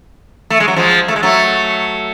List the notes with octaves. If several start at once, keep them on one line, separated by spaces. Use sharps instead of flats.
A3
G#3
F#3
F3 G#3
A3
G#3
F#3 A3